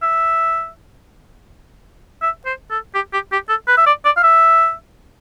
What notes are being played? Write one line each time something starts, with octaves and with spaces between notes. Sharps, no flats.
E5
E5
C5
A4
G4
G4
G4
A4
B4
E5
D5
D5
F5
E5